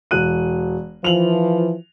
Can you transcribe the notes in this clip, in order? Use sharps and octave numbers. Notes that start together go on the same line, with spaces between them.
E1 F#6 D#7
E3 F3 F7 F#7